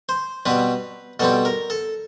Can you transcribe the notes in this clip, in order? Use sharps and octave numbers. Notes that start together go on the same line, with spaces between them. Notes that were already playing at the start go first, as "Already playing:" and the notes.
C5
B2 G3 C4 B4
B2 G3 C4 A4
A#4
A4